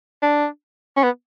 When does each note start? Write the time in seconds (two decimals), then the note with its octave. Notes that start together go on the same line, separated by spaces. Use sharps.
0.23 D4
0.97 C#4
1.03 B3